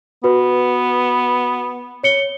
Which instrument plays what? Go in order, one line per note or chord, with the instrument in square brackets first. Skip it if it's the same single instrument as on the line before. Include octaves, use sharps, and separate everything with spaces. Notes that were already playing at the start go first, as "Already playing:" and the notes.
[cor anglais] B3 [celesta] F#4 B4
[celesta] C#5 C#7 G7